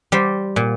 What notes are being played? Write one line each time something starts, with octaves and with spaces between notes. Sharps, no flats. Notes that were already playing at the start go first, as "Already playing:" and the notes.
G3 C5
A#2